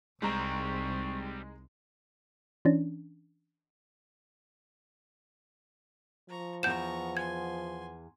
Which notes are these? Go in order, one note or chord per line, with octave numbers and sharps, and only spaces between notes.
C2 G3 G#3 C4 D#4 A#5 C#6
E3 C#4 D4
F3 A#5 C#6
E2 B3 A#5 C#6 G6 E7
G#5 C6 G#6